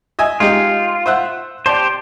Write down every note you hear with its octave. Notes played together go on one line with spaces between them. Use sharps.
D#5 E5 G#5
G#3 D#4 F4 G4
C5 E5 F#5
G4 C5 D5 A5